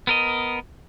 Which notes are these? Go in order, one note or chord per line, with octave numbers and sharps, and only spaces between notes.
B3 A#4 D#5